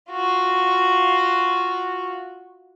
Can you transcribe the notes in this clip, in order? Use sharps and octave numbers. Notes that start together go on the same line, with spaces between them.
F4 F#4